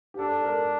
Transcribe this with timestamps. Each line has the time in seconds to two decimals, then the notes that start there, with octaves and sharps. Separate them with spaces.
0.14 G4
0.19 D4 A4
0.41 A4
0.45 A#4